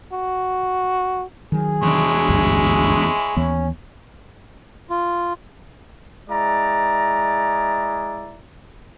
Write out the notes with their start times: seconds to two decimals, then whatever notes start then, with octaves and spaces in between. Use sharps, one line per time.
0.13 F#4
1.52 D#3 F#3 G#4
1.82 E2 G#3 D4 E4 C#5
2.29 G#1 D2 G2
3.37 D#2 E3 B3 C#4
4.90 F4
6.30 G#3 E4 D5 A#5